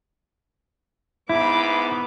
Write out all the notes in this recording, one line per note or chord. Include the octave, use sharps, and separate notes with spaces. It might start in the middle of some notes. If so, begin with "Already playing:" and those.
G#2 B3 E4 B5 D6